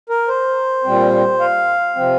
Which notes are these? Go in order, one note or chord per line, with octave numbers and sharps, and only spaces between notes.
A#4
C5
A#2 G3 C4
F5
C3 F3 C4